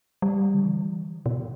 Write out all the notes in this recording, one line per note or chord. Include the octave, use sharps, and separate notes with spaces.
G3
D3
E3
B2